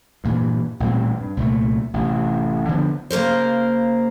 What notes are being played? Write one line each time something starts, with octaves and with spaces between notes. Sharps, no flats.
G2 A#2 E3
A1 A#2 G3 C4
G2
C2 A#2 A3
A1 C3
D3 F3 B3
C#3 A#3 A#4 C5